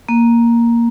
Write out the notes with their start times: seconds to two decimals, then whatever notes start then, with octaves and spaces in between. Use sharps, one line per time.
0.09 A#3